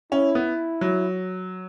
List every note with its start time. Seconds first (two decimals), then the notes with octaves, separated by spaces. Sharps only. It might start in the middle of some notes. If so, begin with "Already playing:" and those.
0.12 C#4 E4
0.35 B3
0.81 F#3